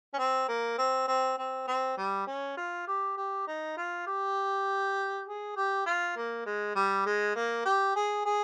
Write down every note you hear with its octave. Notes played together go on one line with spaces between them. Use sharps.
C#4
C4
A#3
C4
C4
C4
C4
G3
C#4
F4
G4
G4
D#4
F4
G4
G#4
G4
F4
A#3
G#3
G3
G#3
A#3
G4
G#4
G#4